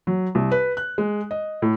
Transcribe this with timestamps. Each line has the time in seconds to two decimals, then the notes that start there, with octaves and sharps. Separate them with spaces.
0.07 F#3
0.35 C2
0.52 B4
0.77 F#6
0.98 G#3
1.31 D#5
1.62 A2